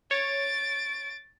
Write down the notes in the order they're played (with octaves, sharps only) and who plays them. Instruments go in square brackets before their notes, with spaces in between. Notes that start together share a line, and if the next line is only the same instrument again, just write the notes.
[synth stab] C#5 [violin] A6 D7